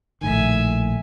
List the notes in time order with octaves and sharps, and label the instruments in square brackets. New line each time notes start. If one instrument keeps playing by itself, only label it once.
[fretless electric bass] A#1 A2 D#3 [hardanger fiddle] E5 G#5